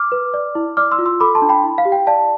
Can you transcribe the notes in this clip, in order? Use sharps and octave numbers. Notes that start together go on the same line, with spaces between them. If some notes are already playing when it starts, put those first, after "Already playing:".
Already playing: D6 F6
B4
D5
E4
D5 D6 F6
C6 E6
F4
C6 E6
A4 B5 D6
A5 C6
D4
G5 B5
E4
F5
G4
G5
D5 F5 A5